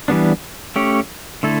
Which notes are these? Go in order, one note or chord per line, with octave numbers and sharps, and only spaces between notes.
E3 G3 B3 D4
A3 C#4 G4 C#5
D3 A3 E4 A4